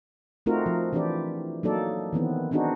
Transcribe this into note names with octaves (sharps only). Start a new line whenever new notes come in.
A3 C4 D#4 F4 F#4 A#4
F3
E3 C4 D4 E4 G4 D5
F#3 A#3 D#4 A4 D5
D#3 E3 B3 C4
B3 C4 D4 D#4 F#4 G#4